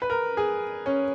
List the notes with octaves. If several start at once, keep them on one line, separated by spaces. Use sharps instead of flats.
B4
A#4
G#4
C#4